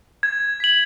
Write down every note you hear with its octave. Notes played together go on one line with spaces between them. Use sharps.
G#6
B6 F#7